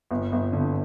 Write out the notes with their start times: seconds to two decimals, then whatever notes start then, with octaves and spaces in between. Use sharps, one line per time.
0.11 G1
0.32 G1
0.53 D3